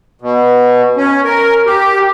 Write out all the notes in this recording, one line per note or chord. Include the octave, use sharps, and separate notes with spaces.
B2
C#4
A#4
G4